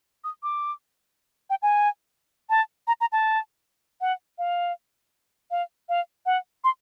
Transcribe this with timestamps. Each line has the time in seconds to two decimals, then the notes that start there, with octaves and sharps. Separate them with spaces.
0.24 D#6
0.43 D6
1.50 G5
1.62 G#5
2.50 A5
2.87 A#5
3.01 A#5
3.12 A5
4.01 F#5
4.38 F5
5.51 F5
5.89 F5
6.26 F#5
6.64 C6